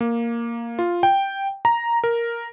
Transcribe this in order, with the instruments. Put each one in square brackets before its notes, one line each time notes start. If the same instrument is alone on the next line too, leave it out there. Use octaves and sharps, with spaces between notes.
[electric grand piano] A#3
F4
G5
A#5
A#4